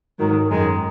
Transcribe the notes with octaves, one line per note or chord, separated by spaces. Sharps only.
G#2 D#3 F#3
F#2 D#3 G#3